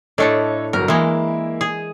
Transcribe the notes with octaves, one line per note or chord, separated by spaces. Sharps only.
A2 A3 D4 A4 C#5 D#5
G1 F#3 A#4
E3 G#3 A#3 E4
G#4